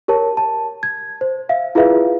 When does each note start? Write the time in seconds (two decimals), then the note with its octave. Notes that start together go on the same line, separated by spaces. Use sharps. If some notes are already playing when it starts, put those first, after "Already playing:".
0.08 G4 A#4 C#5 A5
0.37 A5
0.83 G#6
1.21 C5
1.49 E5 F5
1.75 E4 F4 G#4 B4 E5 F5